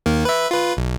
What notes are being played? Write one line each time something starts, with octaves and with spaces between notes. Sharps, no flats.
D#2 D#3 A#3
B4 E5
F4 B4
B1